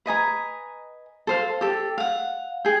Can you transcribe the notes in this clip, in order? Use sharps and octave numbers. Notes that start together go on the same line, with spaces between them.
B4 D#5 G#5 A#5
A4 C5 F5
G4 A4
F5 F#5
G#4 G5